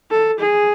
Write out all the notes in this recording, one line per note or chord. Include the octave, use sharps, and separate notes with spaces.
A4
G#4